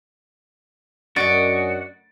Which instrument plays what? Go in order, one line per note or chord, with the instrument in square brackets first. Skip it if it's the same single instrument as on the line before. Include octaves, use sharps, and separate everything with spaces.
[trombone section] F#2 [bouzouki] D4 D#5 [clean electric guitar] F#4 [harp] A6 D7